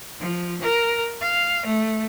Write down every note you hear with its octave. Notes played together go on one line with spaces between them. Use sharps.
F3
A#4
F5
A3